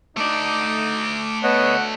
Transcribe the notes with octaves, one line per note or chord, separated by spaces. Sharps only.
A3 D#4 D5 D6
B3 C#5 D#5 F#5